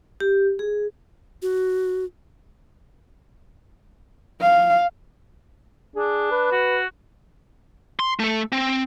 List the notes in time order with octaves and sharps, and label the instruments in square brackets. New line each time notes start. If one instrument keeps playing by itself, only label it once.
[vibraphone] G4
G#4
[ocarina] F#4
[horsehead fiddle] F5
[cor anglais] D4 [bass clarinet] G#4
[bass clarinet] B4
[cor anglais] F#4
[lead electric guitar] C6
A3 A4
C4